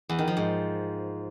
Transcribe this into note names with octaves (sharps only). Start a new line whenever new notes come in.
E2
D#3
F3
G#2